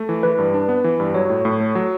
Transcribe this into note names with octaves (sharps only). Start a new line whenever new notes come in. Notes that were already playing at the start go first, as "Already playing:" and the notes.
Already playing: A3
E3
E3 B4
G2
D4
B3
E3
G2
F#3 C#5
A2
A2
A3
F#3